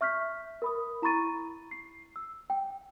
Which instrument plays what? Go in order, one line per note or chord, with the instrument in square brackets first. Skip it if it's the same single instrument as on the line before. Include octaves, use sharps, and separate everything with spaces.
[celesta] E5 C#6 F6 G6 B6
A#4 B5 D#6
E4 A#5 B5 C#6 A6 D#7
C7
E6
G5